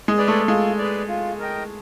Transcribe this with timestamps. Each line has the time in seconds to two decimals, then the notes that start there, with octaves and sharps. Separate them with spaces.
0.08 G#3
0.17 G#4 B4 D5
0.28 A3
0.48 G#3 F4
0.78 G#4 B4 D5
1.08 F4
1.39 A#4 D#5 G5